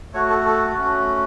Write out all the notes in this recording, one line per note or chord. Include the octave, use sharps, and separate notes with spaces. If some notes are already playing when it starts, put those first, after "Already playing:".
A3 F#4 C#5
A4
A4
A3 C#4 F#4